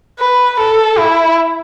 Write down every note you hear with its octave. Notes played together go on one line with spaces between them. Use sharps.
B4
A4
E4